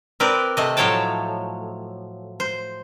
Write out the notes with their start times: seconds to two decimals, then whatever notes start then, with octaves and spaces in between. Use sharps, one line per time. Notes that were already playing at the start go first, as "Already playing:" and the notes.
0.20 C4 A#4 B4 D5
0.57 C3 A3 D#5
0.77 A2 F3 F#3 C#5 G5 A5
2.40 C5